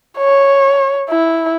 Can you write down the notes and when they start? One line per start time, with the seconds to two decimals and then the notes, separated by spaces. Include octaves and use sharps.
0.18 C#5
1.09 E4